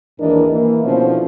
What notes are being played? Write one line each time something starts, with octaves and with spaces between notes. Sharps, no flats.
D#2 G#2 E3 D4 A#4 D#5
E3 A#3
B2 D3 F3 C#4 E4 C5